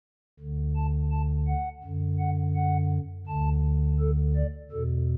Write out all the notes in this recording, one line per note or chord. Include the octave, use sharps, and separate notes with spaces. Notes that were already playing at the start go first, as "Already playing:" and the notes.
D2 D3
A5
A5
F#5
F#2 D3
F#5
F#5
D2 D3 A5
A4
D5
E2 B2 A4